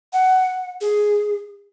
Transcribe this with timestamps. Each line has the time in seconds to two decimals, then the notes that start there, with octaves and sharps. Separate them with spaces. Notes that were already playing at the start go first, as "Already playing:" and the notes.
0.13 F#5
0.81 G#4